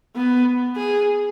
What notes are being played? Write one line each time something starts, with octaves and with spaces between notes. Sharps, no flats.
B3
G#4